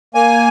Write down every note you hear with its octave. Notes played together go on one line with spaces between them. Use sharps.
A#3 G#5